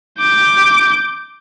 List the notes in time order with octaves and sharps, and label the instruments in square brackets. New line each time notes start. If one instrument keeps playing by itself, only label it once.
[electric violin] D6 G6